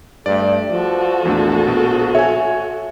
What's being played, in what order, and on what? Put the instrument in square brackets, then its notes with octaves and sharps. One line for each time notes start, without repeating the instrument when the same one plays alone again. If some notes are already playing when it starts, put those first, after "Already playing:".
[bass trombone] G2 [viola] A3 [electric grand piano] D5
[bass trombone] F3 [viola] F#4 A4
[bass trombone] A#1 [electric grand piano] E2 A3 D4
[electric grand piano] B2
[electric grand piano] C#5 G#5 [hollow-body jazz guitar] E5